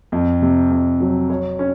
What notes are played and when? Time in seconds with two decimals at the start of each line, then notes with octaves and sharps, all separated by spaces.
0.12 F2
0.42 C3
0.71 F2
1.00 F#3
1.29 C#5
1.59 C#4